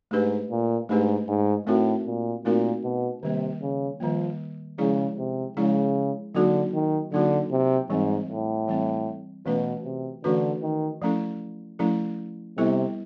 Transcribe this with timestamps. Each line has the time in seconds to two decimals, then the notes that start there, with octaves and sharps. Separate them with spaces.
0.11 G#2 A3 D4 G4 B4
0.51 A#2
0.89 G#2 A3 D4 G4 B4
1.28 G#2
1.67 A2 A3 C4 D#4 F#4 A#4
2.07 A#2
2.45 A#2 A3 C4 D#4 F#4 A#4
2.83 B2
3.22 C3 D#3 G3 A#3
3.61 C#3
4.00 D#3 F3 G3 A#3
4.78 C#3 F3 G#3 C#4 E4 G#4
5.18 C3
5.57 C#3 F3 G#3 C#4 E4 G#4
6.35 D3 F#3 A#3 D#4 F#4 A4
6.74 D#3
7.12 D3 F#3 A#3 D#4 F#4 A4
7.51 C3
7.90 G#2 E3 G3 C4
8.29 A2
8.68 E3 G3 C4
9.46 B2 E3 A3 C#4 F#4 B4
9.85 C3
10.24 D3 E3 A3 C#4 F#4 B4
10.62 D#3
11.02 F3 A3 C#4 E4 A4
11.79 F3 A3 C#4 E4 A4
12.58 C3 G3 B3 E4 A4